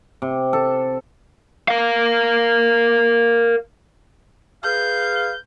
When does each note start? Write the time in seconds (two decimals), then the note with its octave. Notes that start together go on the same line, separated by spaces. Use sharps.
0.22 C3
0.53 A4
1.68 A#4 F5
4.64 G#4 B4 F5 G6